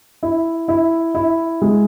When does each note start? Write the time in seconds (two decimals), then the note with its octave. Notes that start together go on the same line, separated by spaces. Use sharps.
0.23 E4
0.68 E4
1.15 E4
1.62 G#3